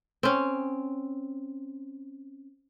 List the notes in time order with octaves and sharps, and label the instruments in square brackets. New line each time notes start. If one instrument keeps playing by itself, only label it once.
[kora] C4 C#4